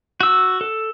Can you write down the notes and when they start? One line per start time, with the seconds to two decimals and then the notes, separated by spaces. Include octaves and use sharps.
0.21 F#4 E6
0.61 A4